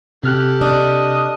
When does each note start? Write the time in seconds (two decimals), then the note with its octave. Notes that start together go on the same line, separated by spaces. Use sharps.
0.24 C3 G4 A4 F6 F#6
0.61 D4 D#5